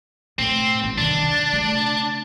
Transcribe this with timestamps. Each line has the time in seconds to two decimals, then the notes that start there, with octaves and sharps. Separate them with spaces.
0.39 A2 C4
0.84 A1
0.98 C3 D#3 D4
1.23 D#3
1.53 C#3 A3